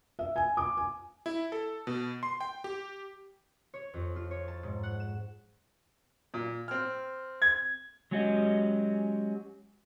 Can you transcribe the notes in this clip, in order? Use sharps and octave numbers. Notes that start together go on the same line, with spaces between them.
E5
G#5
D6
G#5
E4
A4
B2
C6
G5
G4
C#5
F2
F4
C#5
A5
G#2
F#5
E7
A#2
C4 F6
G#6
F#3 G#3 C#4 F#4 G4 D#5